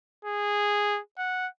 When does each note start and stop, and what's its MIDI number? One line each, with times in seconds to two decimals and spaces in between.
0.25 1.00 68
1.18 1.48 78